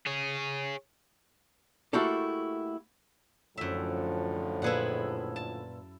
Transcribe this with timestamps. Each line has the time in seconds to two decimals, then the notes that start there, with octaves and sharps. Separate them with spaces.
0.06 G#4 C#5
1.93 A3 A#3 E4 F#4 G4 A4
3.57 F#2 A2 D3 F3 E5
4.62 A#2 E4 G#4 B4 F#5
5.36 A5